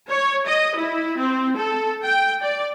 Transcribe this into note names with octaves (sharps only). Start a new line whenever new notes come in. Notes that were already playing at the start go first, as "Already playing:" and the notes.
C#5
D#5
E4
C4
A4
G5
D5